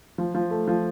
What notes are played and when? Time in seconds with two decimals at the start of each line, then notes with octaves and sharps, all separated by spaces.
0.18 F3
0.35 F3
0.51 A3
0.67 F3